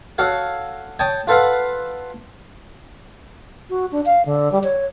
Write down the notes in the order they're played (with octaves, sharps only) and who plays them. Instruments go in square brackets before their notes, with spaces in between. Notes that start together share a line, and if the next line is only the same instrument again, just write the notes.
[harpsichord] F#4 A4 C#5 F5
C#5 G5 A5 D#6
F4 A4 B4 F5 F#5
[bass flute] F#4
D4
F5
D3
G3
C#5